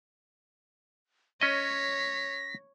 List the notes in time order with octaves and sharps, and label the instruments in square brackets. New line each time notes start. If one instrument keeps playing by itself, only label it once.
[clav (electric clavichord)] C#4 D#5 [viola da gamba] C#5 [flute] A#6 [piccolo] B6